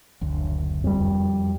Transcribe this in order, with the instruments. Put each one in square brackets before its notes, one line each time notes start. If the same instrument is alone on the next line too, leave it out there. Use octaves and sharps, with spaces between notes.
[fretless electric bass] F#1 D2
[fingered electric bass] F2 G3